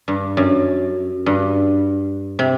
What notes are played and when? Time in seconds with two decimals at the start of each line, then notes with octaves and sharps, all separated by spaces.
0.08 G2
0.37 F#2
1.26 G2
2.39 C3